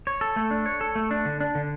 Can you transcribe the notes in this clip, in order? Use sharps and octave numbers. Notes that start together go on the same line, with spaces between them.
C#5
A4
A3
D4
C#5
A4
A3
D4
D3
D4
D3